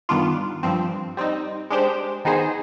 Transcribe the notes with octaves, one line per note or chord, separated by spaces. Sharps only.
G2 D#3 B3 D4 F4
G2 F3 C4
G3 C4 D#4
G#3 D4 G4 C5
D#3 B3 D#4 G#4 C5